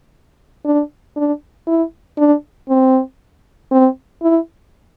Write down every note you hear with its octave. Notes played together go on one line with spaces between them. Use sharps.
D4
D4
E4
D4
C4
C4
E4